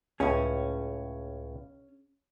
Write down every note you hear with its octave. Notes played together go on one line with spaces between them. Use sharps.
C#2 A2 C#4 G#4